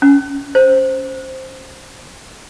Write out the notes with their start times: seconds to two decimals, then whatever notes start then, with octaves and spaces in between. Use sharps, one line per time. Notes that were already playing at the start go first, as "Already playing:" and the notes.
0.02 C#4
0.55 C5